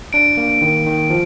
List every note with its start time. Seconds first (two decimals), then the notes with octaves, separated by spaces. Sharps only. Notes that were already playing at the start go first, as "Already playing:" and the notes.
0.13 D4 D7
0.37 A#3
0.61 D#3
0.86 D#3
1.10 F3